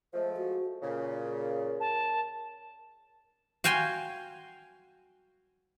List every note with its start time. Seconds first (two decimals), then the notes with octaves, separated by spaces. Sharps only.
0.14 F3 G#3 A3 C5
0.37 F#4
0.82 A#2 C#3 A#4
1.80 A5
3.64 F#4 F5 G5 G#5 C6